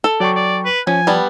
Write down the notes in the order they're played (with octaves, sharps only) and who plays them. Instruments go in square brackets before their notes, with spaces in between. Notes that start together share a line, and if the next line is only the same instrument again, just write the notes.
[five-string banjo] A4
[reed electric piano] F#3 G5 C#6 [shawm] D5
[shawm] D5
B4
[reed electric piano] F3 [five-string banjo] C#4 [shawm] G#5
[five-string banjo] G3 B3 A5